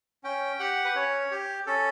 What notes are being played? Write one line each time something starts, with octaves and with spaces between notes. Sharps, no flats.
C#4 G5
G4 F#5
B4
C#4 C#5
G4
C#4 A4